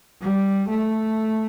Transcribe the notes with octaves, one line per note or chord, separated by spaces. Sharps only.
G3
A3